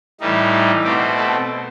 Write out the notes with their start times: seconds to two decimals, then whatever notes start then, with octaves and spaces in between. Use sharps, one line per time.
0.20 A2 E3 G3 D#4
0.84 B2 A3 C4 G4
1.17 A4